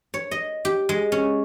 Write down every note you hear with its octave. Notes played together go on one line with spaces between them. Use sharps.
C#5
D#5
G4
G#3
C#4